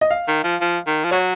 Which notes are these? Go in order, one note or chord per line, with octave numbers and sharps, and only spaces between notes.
D#5
F5
D#3
F3
F3
D#3
F3
F#3 C#5